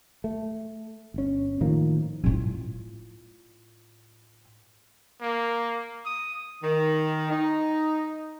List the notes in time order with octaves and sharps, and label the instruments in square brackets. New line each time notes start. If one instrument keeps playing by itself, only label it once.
[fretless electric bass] A3
G1 C#4
A2 D#3 F3 A#3
[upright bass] A2 F4
[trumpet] A#3
D#6
[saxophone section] D#3
D#4